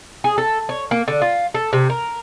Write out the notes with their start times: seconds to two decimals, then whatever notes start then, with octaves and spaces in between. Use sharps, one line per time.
0.24 G#4
0.38 A4
0.69 C#5
0.91 A#3
1.08 D3
1.22 F4
1.54 A4
1.73 C3
1.90 A#4